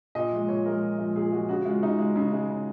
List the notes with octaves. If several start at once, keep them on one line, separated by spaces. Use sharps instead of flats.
A#2 D#5
F3 G#3
A#2 C#5
F3 G#3 A#4
A#2
F3 G#3
A#2 G#4
F3 G#3 F#4
C#3 F#4
G#3 F4
C#3 D#4
G#3
C#3
G#3
C#3